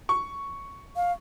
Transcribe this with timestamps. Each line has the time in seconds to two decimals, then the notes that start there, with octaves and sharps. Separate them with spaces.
0.09 C#6
0.96 F5